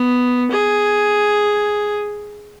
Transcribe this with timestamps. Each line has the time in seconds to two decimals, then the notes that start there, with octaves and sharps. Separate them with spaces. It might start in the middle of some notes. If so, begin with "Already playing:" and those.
Already playing: B3
0.51 G#4